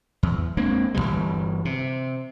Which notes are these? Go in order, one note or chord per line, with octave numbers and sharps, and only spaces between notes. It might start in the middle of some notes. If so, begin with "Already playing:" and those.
E2
G#3 A#3 C4 D4
G1 F2 E3 G3
C3